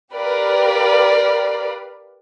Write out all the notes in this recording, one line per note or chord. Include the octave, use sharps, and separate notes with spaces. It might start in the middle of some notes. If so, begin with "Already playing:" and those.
G4 A#4 B4 D5 F5